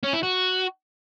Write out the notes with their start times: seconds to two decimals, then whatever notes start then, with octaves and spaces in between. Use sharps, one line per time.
0.03 C#4
0.13 E4
0.23 F#4